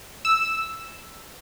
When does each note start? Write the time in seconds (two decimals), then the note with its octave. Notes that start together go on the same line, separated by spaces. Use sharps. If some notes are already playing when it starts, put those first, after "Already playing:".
0.25 E6